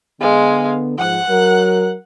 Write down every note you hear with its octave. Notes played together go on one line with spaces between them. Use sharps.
D3 G#3 B3 F5
G#2 F3 F#5 F#6
F#3 A#4